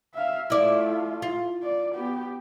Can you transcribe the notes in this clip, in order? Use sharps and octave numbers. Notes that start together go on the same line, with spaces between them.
E5 F5
A3 E4 F4 D5
F4
D5
B3 G4